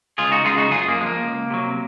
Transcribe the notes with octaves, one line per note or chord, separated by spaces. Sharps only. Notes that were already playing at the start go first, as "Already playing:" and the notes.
C#2 F4 G#4
D#4 F#4
C#3 G#3 F4 G#4
D#4 F#4
F#2 F4 G#4
A#3
F3 G#3
A#3
C#2
C3 F#3